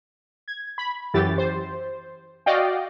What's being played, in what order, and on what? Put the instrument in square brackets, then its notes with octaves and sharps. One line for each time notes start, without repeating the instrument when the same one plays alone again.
[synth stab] G#6
B5
F#2 E3 G4 A6
C5
F#4 D5 D#5 F5 G5